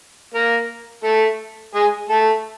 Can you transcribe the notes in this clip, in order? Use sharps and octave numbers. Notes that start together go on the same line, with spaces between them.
A#3 A#4
A3 A4
G#3 G#4
A3 A4